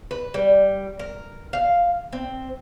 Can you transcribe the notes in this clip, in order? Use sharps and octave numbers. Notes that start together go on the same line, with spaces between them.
B4
G3
A#4
F5
C4